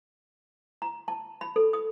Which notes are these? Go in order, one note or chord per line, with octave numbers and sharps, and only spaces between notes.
A#5
A5
B5
A4
D#6